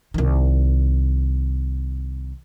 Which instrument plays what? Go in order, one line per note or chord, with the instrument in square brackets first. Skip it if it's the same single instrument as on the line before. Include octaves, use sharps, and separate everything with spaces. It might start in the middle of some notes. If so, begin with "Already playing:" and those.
[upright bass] C2 D#3